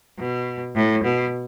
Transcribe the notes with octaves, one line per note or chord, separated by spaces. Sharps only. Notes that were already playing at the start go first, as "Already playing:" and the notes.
B2
A2
B2